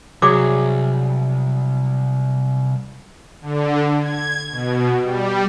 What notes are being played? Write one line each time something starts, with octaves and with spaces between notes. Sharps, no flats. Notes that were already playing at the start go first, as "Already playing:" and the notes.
C2 F#3 G#4 D6
D3
G#6
B2
G3